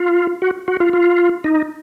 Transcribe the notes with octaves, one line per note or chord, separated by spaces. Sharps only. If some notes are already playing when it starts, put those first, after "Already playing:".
Already playing: F4
F#4
F#4
F4
F4
D#4